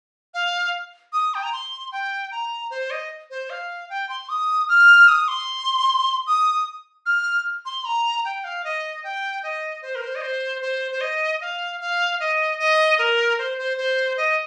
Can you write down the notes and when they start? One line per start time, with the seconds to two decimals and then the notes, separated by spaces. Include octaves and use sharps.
0.34 F5
1.13 D#6
1.34 G5
1.43 A#5
1.53 C6
1.92 G5
2.31 A#5
2.70 C5
2.91 D#5
3.30 C5
3.50 F5
3.90 G5
4.09 C6
4.29 D#6
4.69 F6
5.08 D#6
5.28 C6
6.27 D#6
7.06 F6
7.65 C6
7.85 A#5
8.25 G5
8.44 F5
8.64 D#5
9.04 G5
9.43 D#5
9.82 C5
9.95 A#4
10.02 C5
10.15 D#5
10.22 C5
10.62 C5
10.92 C5
11.01 D#5
11.41 F5
11.81 F5
12.20 D#5
12.59 D#5
12.99 A#4
13.38 C5
13.58 C5
13.78 C5
14.17 D#5